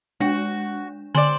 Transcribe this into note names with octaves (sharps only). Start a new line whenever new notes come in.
G#3 D4 F#4
D3 C5 D5 G#5 F#7